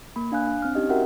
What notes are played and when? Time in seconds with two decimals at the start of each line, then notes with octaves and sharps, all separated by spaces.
0.16 A#3 B5
0.32 D4 F5 G#5 F#6
0.48 D4
0.62 C4 F6
0.75 C#4 D#4 G4 D#5
0.89 F#4 A#4 E5 F#5 G5